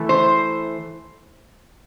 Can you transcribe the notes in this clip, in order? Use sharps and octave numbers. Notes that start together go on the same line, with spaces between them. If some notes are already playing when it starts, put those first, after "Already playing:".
Already playing: E3 A3
C5